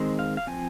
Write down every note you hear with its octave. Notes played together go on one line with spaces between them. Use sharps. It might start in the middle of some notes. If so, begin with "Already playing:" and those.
Already playing: D#3 G#3 C4
F5
F5
F3 C4 G#5